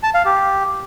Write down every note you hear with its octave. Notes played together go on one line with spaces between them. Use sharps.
A5
F5
G4